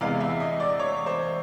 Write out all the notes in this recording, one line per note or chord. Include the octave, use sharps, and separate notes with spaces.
E2 C3 E3 G#3 B3 F5
E5
D#5
D5
C#5
C5